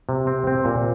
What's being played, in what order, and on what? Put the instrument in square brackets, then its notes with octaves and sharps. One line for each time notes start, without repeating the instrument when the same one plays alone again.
[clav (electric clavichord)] C3
C4
C4
A#2